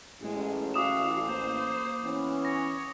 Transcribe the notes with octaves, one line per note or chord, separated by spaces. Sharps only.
A1 G#3
F#4 F5 D6 D#6 E7
A#3 C5
E3 B3 C#4
C#5 A#6